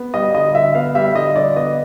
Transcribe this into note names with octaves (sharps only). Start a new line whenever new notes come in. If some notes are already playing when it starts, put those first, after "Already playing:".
Already playing: B3
G3 D#5
D3 D#5
D3 E5
B3 F5
G3 E5
D3 D#5
D3 D5
B3 D#5